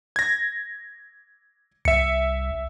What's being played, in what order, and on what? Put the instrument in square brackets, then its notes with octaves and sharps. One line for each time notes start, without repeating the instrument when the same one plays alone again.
[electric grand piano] G#6 A#6
[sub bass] C2 [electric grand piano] E5 C#7